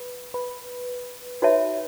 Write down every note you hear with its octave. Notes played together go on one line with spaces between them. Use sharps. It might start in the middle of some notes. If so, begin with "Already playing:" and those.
Already playing: B4
B4
D#4 F#4 B4 C#5 E5 A5